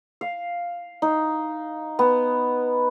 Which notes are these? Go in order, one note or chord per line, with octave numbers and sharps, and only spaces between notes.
F5
D#4
B3